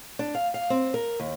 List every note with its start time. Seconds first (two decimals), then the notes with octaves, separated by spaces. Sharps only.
0.19 D4
0.35 F5
0.54 F5
0.70 C4
0.94 A#4
1.20 D#2